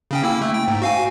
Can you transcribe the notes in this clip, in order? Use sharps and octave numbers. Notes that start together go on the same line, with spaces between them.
C#3 C#4 G5
A#3 E4 E6
A3
G5
G#2
F#4 F5 G#5